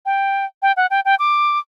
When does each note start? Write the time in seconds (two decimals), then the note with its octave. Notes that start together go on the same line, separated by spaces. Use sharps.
0.06 G5
0.62 G5
0.77 F#5
0.90 G5
1.05 G5
1.19 D6